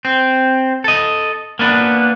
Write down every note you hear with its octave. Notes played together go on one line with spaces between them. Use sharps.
C4
A4 D#5
A#3 B3 D4 B4